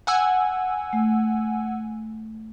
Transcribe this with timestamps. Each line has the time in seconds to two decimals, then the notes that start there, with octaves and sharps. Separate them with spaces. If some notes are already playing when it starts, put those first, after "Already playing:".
0.07 F#5 G#5 E6
0.93 A3